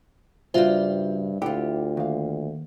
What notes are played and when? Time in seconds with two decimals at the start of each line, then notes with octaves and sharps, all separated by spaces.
0.54 G2 C#3 G3 F4 F#4 C5 E5
1.42 D2 E4 F4 G4 F#5 G5
1.97 D#2 F5